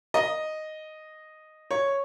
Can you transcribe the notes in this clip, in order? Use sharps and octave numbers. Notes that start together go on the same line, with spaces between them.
D#5
C#5